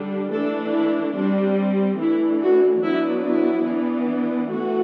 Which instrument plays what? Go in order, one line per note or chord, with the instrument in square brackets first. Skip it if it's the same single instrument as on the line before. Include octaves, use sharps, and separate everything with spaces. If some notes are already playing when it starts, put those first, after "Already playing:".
Already playing: [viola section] D3 G3 D4
E3 A3 D4 A4
E4
G3 C4 D4
E3 A3 D4 E4
F#4
F#3 B3 D4 E4
E4
E3 B3 D4
E3 A3 F#4